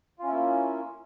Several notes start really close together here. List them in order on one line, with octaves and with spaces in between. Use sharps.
F4 C#4 E4 A#3